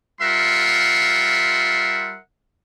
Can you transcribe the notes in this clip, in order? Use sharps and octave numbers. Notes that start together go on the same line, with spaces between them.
G3 F4 A#4 E5 F#5 C6